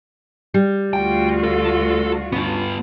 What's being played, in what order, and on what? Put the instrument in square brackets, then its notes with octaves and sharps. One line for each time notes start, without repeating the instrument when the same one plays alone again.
[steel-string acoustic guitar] G3
[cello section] D2 F4 F#4 [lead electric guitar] G5
[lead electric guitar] A4
[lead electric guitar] G2 B3 [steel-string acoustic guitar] C#3 C#5